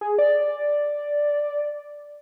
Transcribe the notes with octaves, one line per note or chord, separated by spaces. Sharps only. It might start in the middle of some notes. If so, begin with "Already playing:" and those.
G#4
D5